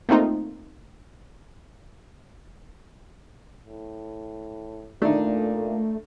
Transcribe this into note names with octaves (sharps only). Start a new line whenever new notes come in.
A3 A#3 C4 D#4 F4
A2
A#2 A3 D4 D#4